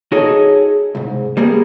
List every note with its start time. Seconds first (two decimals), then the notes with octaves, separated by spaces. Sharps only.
0.12 D#4 F#4 G#4 A4 C#5 D#5
0.95 C2 G#2
1.37 G3 A#3 B3 G#4